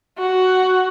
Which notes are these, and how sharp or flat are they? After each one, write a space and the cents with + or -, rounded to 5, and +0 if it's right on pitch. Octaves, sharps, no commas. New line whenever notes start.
F#4 +10